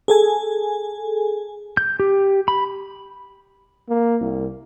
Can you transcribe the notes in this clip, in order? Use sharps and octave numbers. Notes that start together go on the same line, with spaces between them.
G#4 A4 G#5
G6
G4
B5
A#3
C2